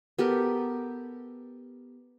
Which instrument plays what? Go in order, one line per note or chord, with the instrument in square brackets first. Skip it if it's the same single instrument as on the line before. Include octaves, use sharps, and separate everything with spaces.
[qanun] B3 G4 A4 A#4